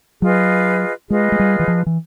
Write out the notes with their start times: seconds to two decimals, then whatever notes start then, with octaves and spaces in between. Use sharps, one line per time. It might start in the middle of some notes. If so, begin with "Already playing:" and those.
0.22 F#3 F4 G#4 B4 D#5
1.10 G#3 F4 G#4 B4 D#5
1.32 G#3
1.39 G3
1.60 E3
1.68 F3
1.86 E3